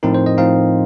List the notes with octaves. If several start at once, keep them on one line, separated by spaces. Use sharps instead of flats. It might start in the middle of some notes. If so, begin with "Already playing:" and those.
A2 F3 C4 D#4 A#4
C5
D#5
A2 F3 C4 D#4 F5